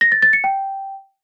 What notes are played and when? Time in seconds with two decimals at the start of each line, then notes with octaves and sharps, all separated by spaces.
0.01 A#6
0.12 A6
0.22 A6
0.33 C#7
0.44 G5